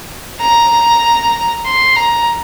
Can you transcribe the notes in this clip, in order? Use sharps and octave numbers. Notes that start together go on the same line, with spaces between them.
A#5
C6
A#5